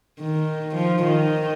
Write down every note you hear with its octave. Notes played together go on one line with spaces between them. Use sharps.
D#3
F3
D#3